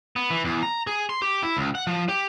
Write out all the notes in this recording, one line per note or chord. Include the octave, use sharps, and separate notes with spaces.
B3
E3
E2
A#5
G#4
C6
G4
E4
C#2
F#5
F3
G4